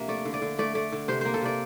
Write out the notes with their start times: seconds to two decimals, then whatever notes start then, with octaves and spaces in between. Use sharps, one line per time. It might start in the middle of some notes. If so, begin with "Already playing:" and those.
Already playing: C3 F3 A#3 D4 E5
0.08 A3 D5
0.25 D3
0.34 D5
0.42 D3
0.59 A3 D5
0.75 A3 D5
0.92 D3
1.08 C3 C5
1.21 A#3 C5
1.34 A4
1.42 C3 D5